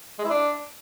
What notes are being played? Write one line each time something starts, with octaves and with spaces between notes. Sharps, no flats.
G#3
E4
D4